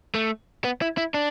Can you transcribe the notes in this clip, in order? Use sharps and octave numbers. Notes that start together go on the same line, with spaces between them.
A3
B3
E4
E4
D4